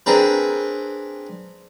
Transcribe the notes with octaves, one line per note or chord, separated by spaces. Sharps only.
C4 D4 G#4 A#4 B4